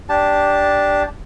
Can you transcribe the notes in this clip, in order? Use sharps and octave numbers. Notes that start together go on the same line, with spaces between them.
D4 G4 A5